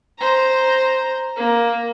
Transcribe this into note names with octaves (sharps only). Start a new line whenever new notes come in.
C5 A#5
A#3